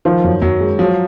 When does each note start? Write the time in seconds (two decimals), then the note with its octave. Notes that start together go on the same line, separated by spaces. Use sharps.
0.05 D#3 F3
0.24 F#2
0.42 F#2 F#3
0.60 G#3
0.79 F3 F#3